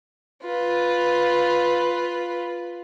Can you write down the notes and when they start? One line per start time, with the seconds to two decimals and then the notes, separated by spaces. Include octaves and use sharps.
0.44 F4 B4